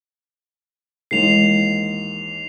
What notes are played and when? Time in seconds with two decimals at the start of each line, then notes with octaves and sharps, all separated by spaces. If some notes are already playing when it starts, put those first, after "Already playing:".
1.11 D#2 G#2 E3 C7 F7